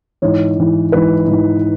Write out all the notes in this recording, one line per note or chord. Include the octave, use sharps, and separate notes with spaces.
G#2 E3 C#5
G#2 E3
G#2 E3 B4
G#2
E3